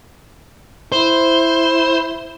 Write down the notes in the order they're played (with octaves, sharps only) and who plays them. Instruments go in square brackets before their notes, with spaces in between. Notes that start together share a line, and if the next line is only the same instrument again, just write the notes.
[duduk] E4 [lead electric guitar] C5